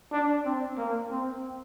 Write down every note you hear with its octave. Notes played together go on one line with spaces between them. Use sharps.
D4
C4
A#3
C4